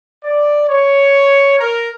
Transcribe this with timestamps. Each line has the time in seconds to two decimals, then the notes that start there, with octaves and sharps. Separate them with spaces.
0.24 D5
0.68 C#5
1.59 A#4